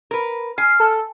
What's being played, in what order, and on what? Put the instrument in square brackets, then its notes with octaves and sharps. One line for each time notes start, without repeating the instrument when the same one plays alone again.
[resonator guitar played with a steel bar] A#4 B4
[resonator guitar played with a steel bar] G#5 [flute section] F6 [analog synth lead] C7
[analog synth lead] A4